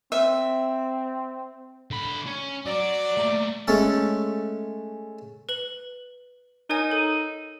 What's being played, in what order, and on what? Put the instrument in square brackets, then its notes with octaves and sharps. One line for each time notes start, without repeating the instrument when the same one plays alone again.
[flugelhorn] C4 [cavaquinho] E5
[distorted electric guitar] D3 B5
C#4
[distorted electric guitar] F#3 [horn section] D5
[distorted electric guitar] A3 A#3
[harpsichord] G#3 A3 C#4 A4
[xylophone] B4 F#7
[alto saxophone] D#4 [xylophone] A#4 C#5 G#5
[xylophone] A4